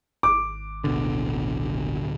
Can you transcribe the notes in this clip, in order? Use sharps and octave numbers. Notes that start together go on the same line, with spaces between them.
G#1 D6
D1 B2 D3